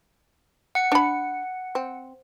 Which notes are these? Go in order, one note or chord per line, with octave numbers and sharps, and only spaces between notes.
F#5 C#7
D4 B5
C4